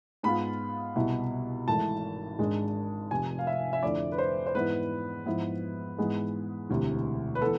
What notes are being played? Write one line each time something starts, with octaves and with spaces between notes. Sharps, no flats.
G#2 G#3 B3 F4 B5
C2 B2 B3 E4
G#1 G#2 E3 A3 A5
G#1 G#2 G#3 D4
F1 F2 C3 G#5
F5
E5
E5
F2 D3 A3 E4 D5
B4
C5
C5
G#2 E3 B3 E4 B4
G#2 F3 B3 E4
G#2 E3 G#3 B3
E1 D2 C3 E3
B4
E3 B3 A4